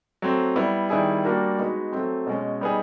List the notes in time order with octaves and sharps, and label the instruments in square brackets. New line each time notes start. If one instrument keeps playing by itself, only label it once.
[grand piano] F#3 A3 C4
G3 B3 E4
D#3 G3 B3 E4 G#4
G3 A#3 D4 F#4 A#4
G#3 B3 D#4 F#4
F#3 A3 C4
B2 G#3 C#4
G3 B3 D#4 G#4